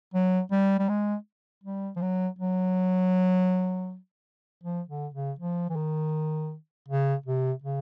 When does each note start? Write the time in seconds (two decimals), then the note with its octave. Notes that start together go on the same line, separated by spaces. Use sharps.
0.14 F#3
0.51 G3
0.79 G3
0.89 G#3
1.64 G3
1.96 F3
2.01 F#3
2.39 F#3
4.63 F3
4.89 D3
5.14 C#3
5.39 F3
5.70 E3
5.76 D#3
6.88 C#3
7.26 C3
7.63 C#3